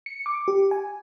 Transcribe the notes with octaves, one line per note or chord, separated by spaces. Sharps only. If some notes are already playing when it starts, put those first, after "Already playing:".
C#7
D6
G4
G#5